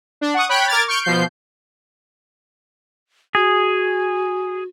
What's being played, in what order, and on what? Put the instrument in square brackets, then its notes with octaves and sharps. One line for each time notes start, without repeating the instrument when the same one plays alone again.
[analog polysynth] D4
F#5 C#6 D#6
C#5 G5 B5 F#6
A#4 D6 F6 G#6 A6
C#6 F6 G6 D7
B2 F3 G6 C7
[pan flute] F#4 [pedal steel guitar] G#4